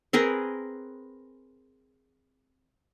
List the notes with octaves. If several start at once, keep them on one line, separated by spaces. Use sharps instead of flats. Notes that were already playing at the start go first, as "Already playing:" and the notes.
C4 G#4 A#4 B4